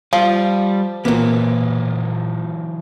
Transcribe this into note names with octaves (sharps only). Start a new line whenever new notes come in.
F3 G3 F4
A#2 E3 F#3 A#3 B3